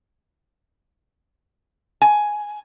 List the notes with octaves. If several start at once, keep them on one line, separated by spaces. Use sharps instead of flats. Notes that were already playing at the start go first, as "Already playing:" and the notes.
G#5